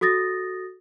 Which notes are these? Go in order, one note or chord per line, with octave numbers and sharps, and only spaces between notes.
F#4 A4 D#6 A6 A#6